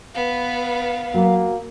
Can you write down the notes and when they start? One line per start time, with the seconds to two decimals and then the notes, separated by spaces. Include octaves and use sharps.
0.14 B3 B4 F5
1.14 F#3 A#3